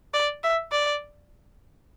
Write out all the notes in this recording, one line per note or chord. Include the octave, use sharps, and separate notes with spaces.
D5
E5
D5